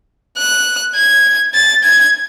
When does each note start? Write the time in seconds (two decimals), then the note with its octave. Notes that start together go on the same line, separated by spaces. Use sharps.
0.38 F#6
0.96 G#6
1.54 A6
1.84 G#6